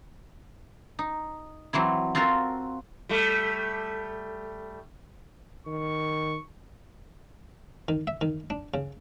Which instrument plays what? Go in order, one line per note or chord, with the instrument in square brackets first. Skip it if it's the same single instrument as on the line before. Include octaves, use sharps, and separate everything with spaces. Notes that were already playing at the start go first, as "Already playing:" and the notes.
[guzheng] D#4
E3 F#3 C4 E4
C4 F4 F#4 A4 A#4
[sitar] G3 A3
[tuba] D#3 [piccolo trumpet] C#6
[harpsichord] D#3
E5
D#3
D4
C#3